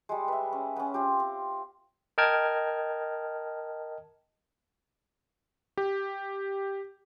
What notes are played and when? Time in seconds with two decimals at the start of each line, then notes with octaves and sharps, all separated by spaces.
0.09 G3 G#3
0.28 B4 E5
0.52 C#4
0.76 B3 C#4
0.94 C4 F4 G4
1.20 C4
2.18 A#4 D#5 G5 A5 F6 G#6
5.77 G4